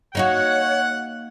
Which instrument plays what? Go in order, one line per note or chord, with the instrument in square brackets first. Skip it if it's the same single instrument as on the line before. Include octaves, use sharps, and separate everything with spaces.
[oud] A#3 D#4 F#4 [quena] C#5 [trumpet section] F#5